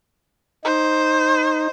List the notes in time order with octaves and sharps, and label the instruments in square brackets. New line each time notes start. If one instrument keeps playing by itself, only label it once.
[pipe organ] D#4 [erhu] C5